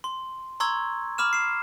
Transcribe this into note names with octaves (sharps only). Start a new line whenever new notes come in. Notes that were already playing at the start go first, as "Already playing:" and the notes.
C6
A#5 C6 C#6 E6 G#6
B5 D6 F6 E7
C7 E7